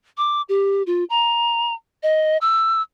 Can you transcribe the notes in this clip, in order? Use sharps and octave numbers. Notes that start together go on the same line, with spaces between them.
D6
G4
F4
A#5
D#5
E6